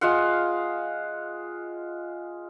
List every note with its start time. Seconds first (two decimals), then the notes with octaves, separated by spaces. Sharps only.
0.01 G#3 F4 F5 F#5